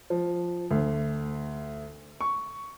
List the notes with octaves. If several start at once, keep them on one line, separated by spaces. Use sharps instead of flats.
F3
D2
C#6